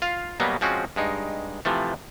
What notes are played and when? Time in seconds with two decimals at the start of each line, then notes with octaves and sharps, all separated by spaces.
0.02 F4 F5
0.40 B2 F#3 G3 A#3 B3
0.61 F3 G#3 C4 C#4 F#4
0.96 G2 G#3 D#4
1.65 C3 E3 F3 A3